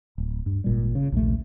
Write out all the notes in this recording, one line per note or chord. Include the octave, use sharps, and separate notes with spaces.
D1
G2
G#1 A#2 G3
C#3
A#1 D#2 C3 A3